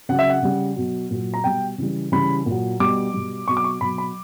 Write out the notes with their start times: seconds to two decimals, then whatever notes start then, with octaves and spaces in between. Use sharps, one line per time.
0.09 C#3 F#3 F#5
0.19 E5
0.30 F#5
0.42 C#3 G3
0.76 B2 F#3
1.11 A#2 F#3
1.34 A#5
1.44 B2 G3 G5
1.78 C#3 E3 G3
2.12 C#3 E3 G3 B5
2.46 A#2
2.51 F#3
2.80 B2 G3 D6
3.14 B2 G3
3.48 B2 F#3 C#6
3.57 D6
3.64 C#6
3.81 B2 F#3 B5
3.98 B5